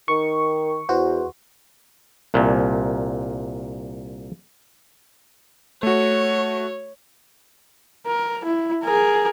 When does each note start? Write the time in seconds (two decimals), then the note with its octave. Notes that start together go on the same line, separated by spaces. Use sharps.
0.08 D#3 C#6
0.89 E2 F#4 C5
2.34 C2 A#2
5.83 A3 F#4 C#5
8.07 A#4
8.45 E4
8.84 G#4 A#4